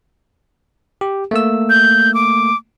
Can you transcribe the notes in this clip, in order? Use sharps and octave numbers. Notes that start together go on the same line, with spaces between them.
G4
A3 A#3 E6
G6
D6